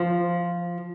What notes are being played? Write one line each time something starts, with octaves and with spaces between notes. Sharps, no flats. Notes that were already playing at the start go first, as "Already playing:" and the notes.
Already playing: F3